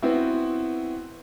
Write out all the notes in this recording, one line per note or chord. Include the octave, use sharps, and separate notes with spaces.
B3 C4 E4 F#4